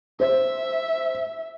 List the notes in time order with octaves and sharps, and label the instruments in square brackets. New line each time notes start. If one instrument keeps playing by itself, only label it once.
[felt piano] C5 [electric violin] E5